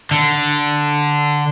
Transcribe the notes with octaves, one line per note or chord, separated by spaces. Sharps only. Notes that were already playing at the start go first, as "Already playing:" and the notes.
D3